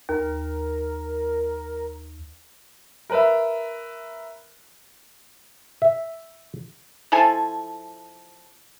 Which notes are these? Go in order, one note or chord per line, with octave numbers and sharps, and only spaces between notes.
D#2 A#4
A#4 B4 E5
E5
F3 E4 A4 G#5